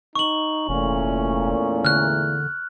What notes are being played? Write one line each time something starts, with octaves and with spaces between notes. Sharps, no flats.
D#4 C#6 F#7
F1 E2 A#2 A3 C#4
D3 F6 F#6